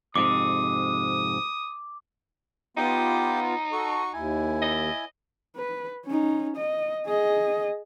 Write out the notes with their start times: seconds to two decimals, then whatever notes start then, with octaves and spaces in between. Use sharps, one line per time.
0.16 F2 G#2 C3 D6 D#6
2.77 B3 D#4 F4 G4 G5 D6
3.72 F#4 A4 C#6
4.14 D#2 E4 G#5
4.62 D#5
5.56 B4
6.06 C#4 D#4
6.57 D#5
7.06 G#4 D#5